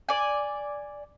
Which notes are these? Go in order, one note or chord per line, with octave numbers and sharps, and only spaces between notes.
D5 G#5